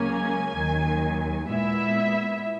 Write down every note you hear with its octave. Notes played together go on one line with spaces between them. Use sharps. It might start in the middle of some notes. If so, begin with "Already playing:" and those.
Already playing: C#2 C#3 F#3 A#3 C#4 G#5
D#2 D#3 F#3
A#2 G#3 B3 E4 E5